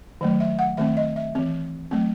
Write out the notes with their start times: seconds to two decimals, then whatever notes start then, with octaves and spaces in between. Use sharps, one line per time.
0.21 D#3 F#3 A3
0.40 E5
0.59 F#5
0.77 D#3 A3 C4 E5
0.97 D#5
1.16 E5
1.35 E3 C4
1.91 F#3 A3 C4